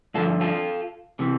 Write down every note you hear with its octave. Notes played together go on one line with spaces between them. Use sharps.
G2 D3 F3 F4 A4
F4 A4
C3 E3